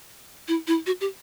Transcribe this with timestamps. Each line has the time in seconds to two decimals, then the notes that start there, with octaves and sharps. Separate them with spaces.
0.48 E4
0.67 E4
0.86 F#4
1.01 G4